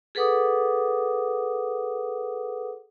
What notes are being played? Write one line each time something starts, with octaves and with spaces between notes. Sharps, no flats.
G#4 A4 B4 F#5 D6 D#6